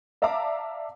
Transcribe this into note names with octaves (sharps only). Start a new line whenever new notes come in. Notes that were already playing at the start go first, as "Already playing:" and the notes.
D5 E5 F5 A5 A#5 D6